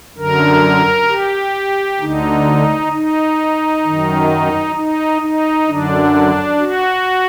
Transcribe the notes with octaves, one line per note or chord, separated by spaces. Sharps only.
F#2 D3 A#4
G4
D2 D3 D#4
D#4
F#2 D#3
D#4
D#4
F#2 D3 D4
F#4